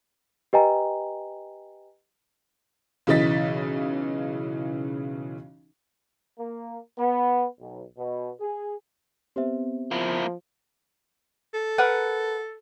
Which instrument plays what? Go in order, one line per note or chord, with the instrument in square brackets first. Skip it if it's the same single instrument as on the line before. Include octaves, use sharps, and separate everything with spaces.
[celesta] G4 B4 D#5 G5 G#5 A#5
[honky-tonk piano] B1 C#3 E3 D#5 A6 B6
[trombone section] A#3
B3
B1
B2
G#4
[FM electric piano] B3 C4 [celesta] G4 C5 E5
[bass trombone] F3 [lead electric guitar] A#3 E4
[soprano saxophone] A4
[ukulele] A#4 B4 F#5